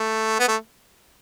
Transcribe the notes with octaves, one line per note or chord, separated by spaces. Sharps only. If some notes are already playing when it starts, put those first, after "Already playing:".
Already playing: A3
B3
A3